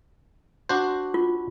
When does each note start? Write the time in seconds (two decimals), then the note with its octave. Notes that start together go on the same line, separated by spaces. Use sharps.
0.69 D4 F#4 C5
1.14 F4